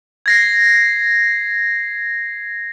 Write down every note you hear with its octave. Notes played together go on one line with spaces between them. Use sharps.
G#6 A#6 C7